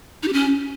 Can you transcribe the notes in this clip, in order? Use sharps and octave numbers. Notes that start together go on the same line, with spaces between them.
D#4
G4
C#4